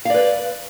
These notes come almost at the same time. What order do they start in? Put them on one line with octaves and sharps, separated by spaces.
F5 D5 B4